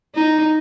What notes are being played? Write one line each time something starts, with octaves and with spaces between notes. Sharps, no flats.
D#4